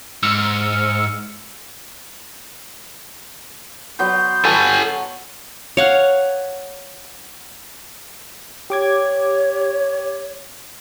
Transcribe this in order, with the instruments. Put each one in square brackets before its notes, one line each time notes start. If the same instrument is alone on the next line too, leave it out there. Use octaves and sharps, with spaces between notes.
[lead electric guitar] G#2 [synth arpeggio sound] E6 F6 C#7
[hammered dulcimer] F#3 B3 C6 [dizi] G6
[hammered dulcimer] F#4 C#5 [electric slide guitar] A4 G#5
[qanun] C#5 F5 F#5
[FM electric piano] G4 D6 G#6 [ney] C#5